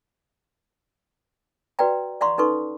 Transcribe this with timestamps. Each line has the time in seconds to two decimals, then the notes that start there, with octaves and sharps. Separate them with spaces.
1.79 F#4 B4 D5 F#5 G5 A#5
2.21 D5 F5 F#5 A#5 C6 C#6
2.38 C#4 D#4 A4 B4 C6 C#6